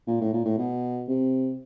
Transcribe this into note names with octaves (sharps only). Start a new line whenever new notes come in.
A#2
A2
A#2
A2
B2
C3